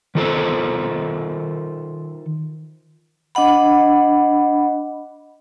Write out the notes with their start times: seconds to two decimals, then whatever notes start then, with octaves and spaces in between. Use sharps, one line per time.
0.15 D#3 F4 A4 C5
3.35 D4 D#5 F#5 B5